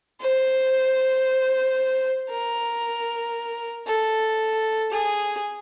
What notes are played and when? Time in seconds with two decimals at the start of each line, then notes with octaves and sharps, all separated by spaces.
0.21 C5
2.29 A#4
3.87 A4
4.92 G#4